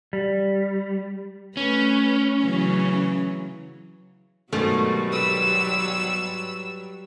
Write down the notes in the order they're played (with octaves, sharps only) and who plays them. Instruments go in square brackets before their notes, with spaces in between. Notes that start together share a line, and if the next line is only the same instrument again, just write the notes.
[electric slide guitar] G3
[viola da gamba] A3 B4 [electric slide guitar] C#4
[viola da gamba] C#3 E3 F#3
[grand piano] G#2 B2 D#3 [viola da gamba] F#3 G3 [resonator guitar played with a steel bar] A3
[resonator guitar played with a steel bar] B4 [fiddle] E6